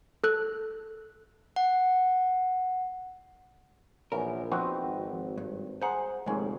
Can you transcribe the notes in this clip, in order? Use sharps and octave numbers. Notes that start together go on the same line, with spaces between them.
A4 F#6
F#5
A#1 E3 B3 C#4 A#4
F3 B3 C4 D#4 F#4
G#1
G2
G#4 C5 F#5 A#5
F1 D#2 G#2 D#3 G#3 C#4